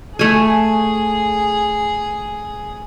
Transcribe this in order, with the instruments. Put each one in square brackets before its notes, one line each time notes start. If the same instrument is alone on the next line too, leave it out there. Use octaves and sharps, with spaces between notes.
[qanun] A3 G#5 [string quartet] G#4